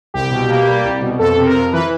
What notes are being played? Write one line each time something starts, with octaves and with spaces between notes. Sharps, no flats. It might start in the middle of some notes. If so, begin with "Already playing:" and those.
C2 G4
B2
A#3
G3
C2
B2
F2 A4
C3
A#4
F2
E3 B4